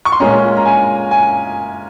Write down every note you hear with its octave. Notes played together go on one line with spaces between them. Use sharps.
C#6
C6
A#2 G#3 C#4 A#5
A#5
G#5
G#5